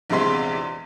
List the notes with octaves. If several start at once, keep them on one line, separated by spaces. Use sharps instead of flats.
A#1 E2 C3 G#3 C6 B6